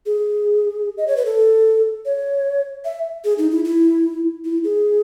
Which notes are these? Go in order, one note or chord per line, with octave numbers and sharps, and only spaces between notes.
G#4
D#5
C#5
B4
A4
C#5
E5
G#4
D#4
E4
E4
E4
G#4